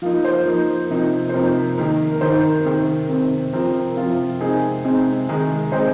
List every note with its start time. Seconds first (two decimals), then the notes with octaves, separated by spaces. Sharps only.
0.02 F3 A#3 D#4 F5
0.25 C5
0.46 F3 A#3 D#4
0.90 C3 F3 A#3 D#4
1.29 C5
1.33 C3 F3 A#3 D#4 A#4
1.77 D#3 A#3 D#4 A#4
2.12 A#4
2.21 D#3 A#3 D#4 C5
2.65 C3 D#3 C4
3.09 C3 D#3 C4
3.53 C3 F3 C4 A#4
3.97 C3 F3 C4 F4
4.41 C3 G#3 C4 D#4 G#4
4.85 C3 G#3 C4 D#4
5.29 C3 D#3 G#3 D#4 A#4
5.72 C3 D#3 G#3 D#4 C5